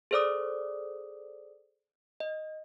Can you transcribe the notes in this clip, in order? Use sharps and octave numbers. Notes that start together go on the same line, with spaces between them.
G#4 A4 C5 D5 D6 D#6
D#5